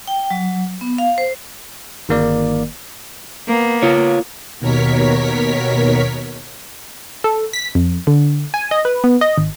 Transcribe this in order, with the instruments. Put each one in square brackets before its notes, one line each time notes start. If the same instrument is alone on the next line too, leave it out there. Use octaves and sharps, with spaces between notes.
[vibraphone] G5
F#3
B3
F5
C5
[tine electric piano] G1 D#3 A#3 A#4 D5
[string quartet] A#3 B3
[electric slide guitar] F4 C#5
[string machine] D#2 B2 A#4 C#5 B6
[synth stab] A4
B6
F2
D3
G#5
D#5
B4
B3
D#5
G#1